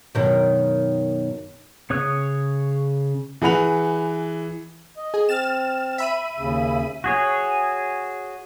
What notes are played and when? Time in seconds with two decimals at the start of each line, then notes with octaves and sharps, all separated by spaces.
0.15 F#2 B2 D#3
1.90 C#3 C#5 D#6 F#6
3.42 E3 G#4 F#5 B5 F7
4.97 D#5
5.14 G#4
5.29 C4 F6 A6 E7
5.98 E5 B5 D#7
6.38 D#2 C#3
7.04 F#4 G#4 C#5